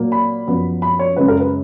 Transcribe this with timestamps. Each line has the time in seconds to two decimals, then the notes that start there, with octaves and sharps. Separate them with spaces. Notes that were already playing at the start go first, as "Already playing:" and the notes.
Already playing: A#2 F#3 A#3
0.12 B5
0.47 F#2 F3 B3
0.82 B5
0.99 C#5
1.16 F#2 C#3 G#3 B4
1.28 A#4
1.40 B4